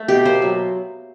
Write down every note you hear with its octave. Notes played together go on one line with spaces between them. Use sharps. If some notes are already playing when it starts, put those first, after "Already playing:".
Already playing: A3
B2 G4
A#3 C5
F#3